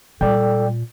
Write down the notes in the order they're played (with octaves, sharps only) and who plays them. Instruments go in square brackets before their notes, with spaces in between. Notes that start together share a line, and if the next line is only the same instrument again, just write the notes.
[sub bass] A#2 [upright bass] G3 G#3 [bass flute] A4 [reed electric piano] D5 G5